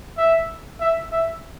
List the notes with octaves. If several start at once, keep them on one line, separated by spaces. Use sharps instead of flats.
E5
E5
E5